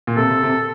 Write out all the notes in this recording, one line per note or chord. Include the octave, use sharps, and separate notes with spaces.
A#2
C3 A4
C3
C3